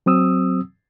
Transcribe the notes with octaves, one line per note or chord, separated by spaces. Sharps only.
F#3 C4 D#6 E6